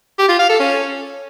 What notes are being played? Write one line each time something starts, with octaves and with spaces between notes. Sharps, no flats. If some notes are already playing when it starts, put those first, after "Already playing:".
G4
F4
F5
A4
C#4